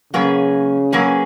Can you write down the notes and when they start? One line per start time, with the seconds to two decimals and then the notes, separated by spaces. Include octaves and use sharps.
0.13 C#3 F#3 A#3 C#4 G#4 B4
0.92 F#3 A#3 C#4 G#4 B4